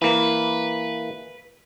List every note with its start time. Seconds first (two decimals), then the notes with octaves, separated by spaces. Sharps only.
0.02 E3 A#3 B4